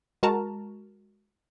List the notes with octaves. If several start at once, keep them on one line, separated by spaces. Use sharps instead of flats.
G#3 F#4 A#4 A5 A#5